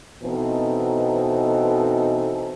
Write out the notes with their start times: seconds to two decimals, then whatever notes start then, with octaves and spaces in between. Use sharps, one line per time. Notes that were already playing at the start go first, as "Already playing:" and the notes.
0.23 B2 E3 C4 D#4 A4